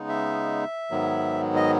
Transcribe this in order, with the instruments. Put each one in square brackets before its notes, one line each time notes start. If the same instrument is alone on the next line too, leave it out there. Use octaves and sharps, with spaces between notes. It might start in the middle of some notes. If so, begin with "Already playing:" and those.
Already playing: [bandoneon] C#3 G#3 B3 D#4
E5
G#2 D#3 F#3 B3
D#5